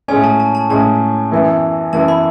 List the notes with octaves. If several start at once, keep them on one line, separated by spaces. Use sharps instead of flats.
A2 G#3 C#4 G#5
A5
A5
A5
A2 G#3 C#4 A5
F#2 E3 B3 E4
F#2 E3 B3 E4 A5
B5